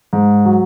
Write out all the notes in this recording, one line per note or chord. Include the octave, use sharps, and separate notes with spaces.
G#2
F#3